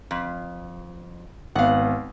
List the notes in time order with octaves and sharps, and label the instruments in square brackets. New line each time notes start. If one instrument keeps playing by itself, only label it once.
[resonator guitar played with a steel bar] F2
[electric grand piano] G#1 B3 [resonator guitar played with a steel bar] F5 F#5